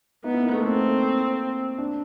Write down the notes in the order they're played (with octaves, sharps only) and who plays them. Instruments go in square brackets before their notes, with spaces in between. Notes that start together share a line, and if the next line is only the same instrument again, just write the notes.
[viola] B3 [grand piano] D#4
[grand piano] E4
A#3
A3
[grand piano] A#3 [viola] C4
[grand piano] D4